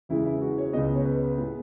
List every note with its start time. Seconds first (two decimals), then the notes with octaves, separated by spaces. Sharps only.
0.09 E2 C#3 E3 G#3 E4
0.25 E4
0.42 F#4
0.58 C#5
0.73 C#2 C#3 G#3 B3 D#5
0.95 C#5
1.05 B4
1.38 A2 G#3 B3